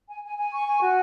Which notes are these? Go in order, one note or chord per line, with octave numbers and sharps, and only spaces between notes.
G#5
G#5
G#5
C#6
G#5
F#4